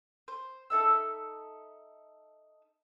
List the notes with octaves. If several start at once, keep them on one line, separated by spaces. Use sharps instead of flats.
C5
D#4 A4 E5 E6